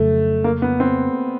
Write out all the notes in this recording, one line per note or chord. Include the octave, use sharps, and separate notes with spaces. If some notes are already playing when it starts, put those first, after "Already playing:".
Already playing: F2 C#3 F#3 A3
A#3
B3
C4